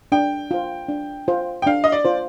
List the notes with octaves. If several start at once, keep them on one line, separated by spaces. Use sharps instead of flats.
D4 G5
F4 C5
D4
F4 C5
G5
D4 F5
D#5
D5
F4 C5